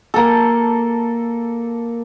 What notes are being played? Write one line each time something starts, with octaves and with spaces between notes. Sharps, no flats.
A#3 A4